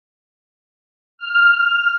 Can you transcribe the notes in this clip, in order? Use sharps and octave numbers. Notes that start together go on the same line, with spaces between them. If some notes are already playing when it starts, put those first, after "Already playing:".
F6